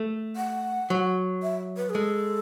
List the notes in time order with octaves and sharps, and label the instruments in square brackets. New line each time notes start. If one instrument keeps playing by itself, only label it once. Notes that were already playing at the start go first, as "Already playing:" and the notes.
Already playing: [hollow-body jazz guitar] A3
[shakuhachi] F#5
[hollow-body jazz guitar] F#3
[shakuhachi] E5
B4
G#4
[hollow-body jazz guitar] G#3 [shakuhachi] A4